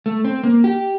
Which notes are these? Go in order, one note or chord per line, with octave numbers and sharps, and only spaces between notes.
A3
C4
A#3
G4